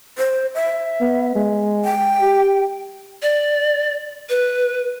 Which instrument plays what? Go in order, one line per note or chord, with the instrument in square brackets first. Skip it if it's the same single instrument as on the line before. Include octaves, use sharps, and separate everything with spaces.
[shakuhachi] C5
E5
[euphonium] B3
G#3
[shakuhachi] G5
[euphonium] G4
[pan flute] D5
B4